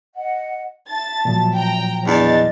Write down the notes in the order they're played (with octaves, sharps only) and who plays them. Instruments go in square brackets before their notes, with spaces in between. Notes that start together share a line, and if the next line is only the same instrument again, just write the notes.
[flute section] D#5 F#5
[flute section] E5 A5 [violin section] A6
[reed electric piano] A#2 F3 F#3
[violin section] G5 A#5
[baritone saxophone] E2 [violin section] D4 A6 [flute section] D#5